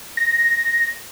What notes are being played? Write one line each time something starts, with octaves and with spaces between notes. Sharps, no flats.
A#6